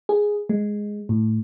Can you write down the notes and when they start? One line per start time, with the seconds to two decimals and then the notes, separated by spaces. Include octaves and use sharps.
0.09 G#4
0.49 G#3
1.09 A2